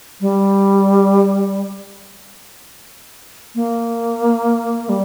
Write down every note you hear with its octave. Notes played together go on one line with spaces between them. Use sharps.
G3
A#3
G3